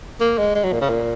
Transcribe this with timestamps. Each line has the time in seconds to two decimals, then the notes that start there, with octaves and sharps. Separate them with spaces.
0.21 A#3
0.38 G#3
0.55 G#3
0.64 F#3
0.72 A#2
0.81 C#3
0.90 A#2